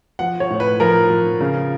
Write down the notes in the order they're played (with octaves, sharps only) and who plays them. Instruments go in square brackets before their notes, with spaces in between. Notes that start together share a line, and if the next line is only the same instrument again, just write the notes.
[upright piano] F3 F#5
C#5
A2
B4
F3 A#4
F3
C#3